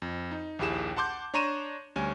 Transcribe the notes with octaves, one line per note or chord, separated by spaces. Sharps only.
F2
D#4
A#1 D#2 E4 G4 G#4 E7
F#5 A5 C6 D6 G6
D4 C#5 A#5 C6 D#7 E7
D2 G3 C#4 G#5